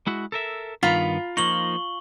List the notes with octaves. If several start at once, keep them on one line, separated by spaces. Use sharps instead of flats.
G#3 E4 F#4
A4 A#4 E5
G2 D#3 B3 F4 A#5 B5
F3 A#3 D#4 C#6 F#7 G7